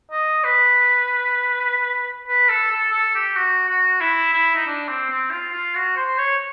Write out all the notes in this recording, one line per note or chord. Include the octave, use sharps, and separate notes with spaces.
D#5
B4
B4
A4
A4
A4
G4
F#4
F#4
E4
E4
D#4
D4
C4
C4
F4
F4
F#4
C5
C#5